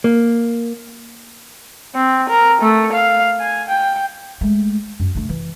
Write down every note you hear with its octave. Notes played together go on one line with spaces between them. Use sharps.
A#3
C4
A#4
A3
F5
G#5
G5
G#3 A3
F#2
D3 A3
E3